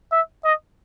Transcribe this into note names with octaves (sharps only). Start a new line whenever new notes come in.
E5
D#5